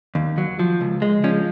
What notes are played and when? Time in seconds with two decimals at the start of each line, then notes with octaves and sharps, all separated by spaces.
0.15 D#2
0.38 F#3
0.59 F3
0.81 C#2
1.02 G#3
1.24 F3 C#4